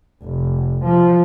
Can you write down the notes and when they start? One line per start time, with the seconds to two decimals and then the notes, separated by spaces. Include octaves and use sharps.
0.23 F1
0.84 F3